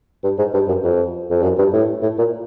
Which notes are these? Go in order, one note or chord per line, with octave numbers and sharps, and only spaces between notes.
G2
G#2
G2
F#2
F2
F2
F#2
G2
A2
A2
A#2